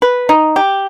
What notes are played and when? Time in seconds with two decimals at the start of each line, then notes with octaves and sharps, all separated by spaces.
0.02 B4
0.29 D#4
0.56 G4